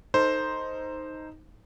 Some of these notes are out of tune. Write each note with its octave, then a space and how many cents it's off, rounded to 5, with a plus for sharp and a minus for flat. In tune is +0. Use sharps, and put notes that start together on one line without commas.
D#4 +5 A4 +30 C5 +0